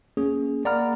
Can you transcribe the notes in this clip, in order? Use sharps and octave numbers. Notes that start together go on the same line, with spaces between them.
A#3 C#4 G#4
A#3 D5 F#5 A#5 B5 F6